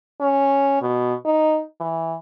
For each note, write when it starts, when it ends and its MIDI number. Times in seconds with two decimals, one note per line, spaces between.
0.21 0.77 61
0.81 1.14 47
1.25 1.62 63
1.80 2.16 52